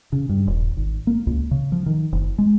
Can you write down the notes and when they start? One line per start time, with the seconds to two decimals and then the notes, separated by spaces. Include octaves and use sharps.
0.12 C#3
0.29 G2
0.47 D#1
0.77 G#1
1.07 A#3
1.27 C#2
1.51 C#3
1.72 F3
1.86 D#3
2.13 F#1
2.38 G#3